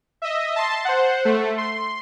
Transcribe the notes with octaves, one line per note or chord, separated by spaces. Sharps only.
D#5 E5
A5 C6
C5 F#5
A3
C6